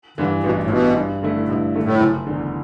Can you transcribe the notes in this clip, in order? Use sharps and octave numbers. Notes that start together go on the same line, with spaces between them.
G2 D3 E3
A1 B2
A2
G2 B2 E3
G2
D3 A3 E4
G2 B2
D3 A3 E4
A2
F#1
E2 D3